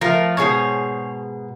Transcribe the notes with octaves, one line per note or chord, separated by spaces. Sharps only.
F3 A3 F4 A#4 F5
G#2 B2 G#4 C5 C#5